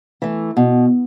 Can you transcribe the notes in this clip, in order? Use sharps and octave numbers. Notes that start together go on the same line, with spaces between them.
E3 A3
B2